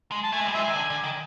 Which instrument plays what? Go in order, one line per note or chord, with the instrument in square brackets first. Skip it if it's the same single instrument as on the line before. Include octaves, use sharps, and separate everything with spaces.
[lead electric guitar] G#3
[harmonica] A5
[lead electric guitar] A3 [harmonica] G#5
[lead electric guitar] G#3
G3
[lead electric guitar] G#3 [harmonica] E5 G#5
[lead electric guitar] D#3
D3
D3
D#3